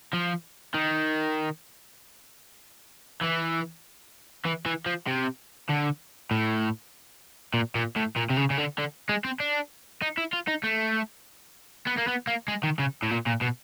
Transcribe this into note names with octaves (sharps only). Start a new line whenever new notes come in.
F3
D#3
E3
E3
E3
F3
C3
D3
A2
A#2
A#2
A2
A#2
C3
C#3
C#3
D3
D3
G#3
C4
D4
D#4
E4
F4
D#4
A3
B3
A#3
B3
A#3
G#3
D#3
C#3
A2
A#2
A#2
B2